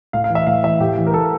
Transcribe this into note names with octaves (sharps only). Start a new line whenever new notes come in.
A2 F5
F5
E3
E5
A2 F5
E3 E5
A2 G4
E3
A#4
A2 A4